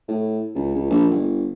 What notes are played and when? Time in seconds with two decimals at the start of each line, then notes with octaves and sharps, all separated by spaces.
0.08 A2
0.55 C#2
0.74 C#2
0.90 A#1
1.10 G1